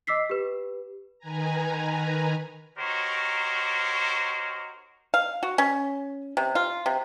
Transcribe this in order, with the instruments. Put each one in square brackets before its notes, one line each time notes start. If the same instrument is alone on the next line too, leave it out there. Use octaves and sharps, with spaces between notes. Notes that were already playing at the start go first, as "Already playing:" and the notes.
[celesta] D#5 D6 E6 B6 C7
G4 B4
[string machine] D#3 B4 G#5 A#5
[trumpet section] D#4 F#4 G4 A#4 C5 C#5
[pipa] F5
F#4
C#4
C3
F4
C3